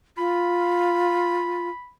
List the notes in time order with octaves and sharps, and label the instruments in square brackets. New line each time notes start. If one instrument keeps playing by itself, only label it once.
[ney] F4 [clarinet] B5